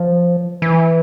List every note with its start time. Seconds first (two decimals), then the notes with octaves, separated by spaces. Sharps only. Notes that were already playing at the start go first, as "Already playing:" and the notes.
Already playing: F3
0.62 E3